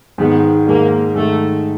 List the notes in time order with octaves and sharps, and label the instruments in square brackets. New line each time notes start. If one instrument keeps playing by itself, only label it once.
[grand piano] G#2 D#3 G#3 [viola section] B3
[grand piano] G#2 D#3 G#3 [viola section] A#3
[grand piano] G#2 D#3 G#3 [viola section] A3